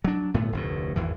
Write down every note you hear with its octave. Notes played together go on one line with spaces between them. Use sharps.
F#3 D4
G1 A2 A3 B3
F1 D2 A2
G#1 E2 E3